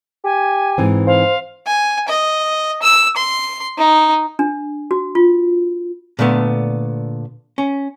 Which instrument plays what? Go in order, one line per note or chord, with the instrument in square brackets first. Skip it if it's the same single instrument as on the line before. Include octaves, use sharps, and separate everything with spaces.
[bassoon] G4 [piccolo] G#5
[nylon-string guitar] G#2 E3 C4
[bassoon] C5 [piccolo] F5
[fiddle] G#5
D#5
E6
C6
D#4
[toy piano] D4
F#4
F4
[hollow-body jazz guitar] A#2 D3 A3 B3
C#4